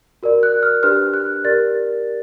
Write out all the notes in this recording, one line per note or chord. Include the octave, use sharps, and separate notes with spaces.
F#4 A#4 D5
F#6
F6
D4 G4 B4 F6
F#6
G4 A#4 D5 A6